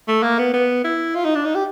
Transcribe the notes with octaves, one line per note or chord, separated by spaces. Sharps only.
A3
A#3
B3
B3
E4
F4
D#4
D4
D#4
G4